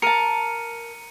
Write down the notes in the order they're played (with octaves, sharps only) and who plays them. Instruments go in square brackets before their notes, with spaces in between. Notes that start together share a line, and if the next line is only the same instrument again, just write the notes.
[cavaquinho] A#4 A5 [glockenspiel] C#7 D#7